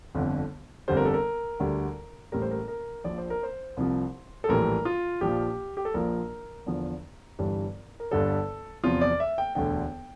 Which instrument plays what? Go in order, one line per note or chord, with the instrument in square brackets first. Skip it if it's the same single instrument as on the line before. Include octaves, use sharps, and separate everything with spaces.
[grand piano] G1 F2 D3
G1 F2 D3 G3 C5
A#4
A4
A#4
D2 D3 G3
A1 A2 G3 A#4
C5
A#4
A#4
A#1 A#2 F3 D5
C5
A#4
C5
C2 C3 F3
A4
A#1 A2 E3 G3 A#4
F4
A#1 A#2 F3 G4
G4
A4
A#1 A#2 F3 A#4
E2 D3 F3
G1 G2 E3 G3
A#4
G1 G2 D3 G3 A4
E2 C3 F3 F4
D5
E5
G5
E1 D2 D3 G5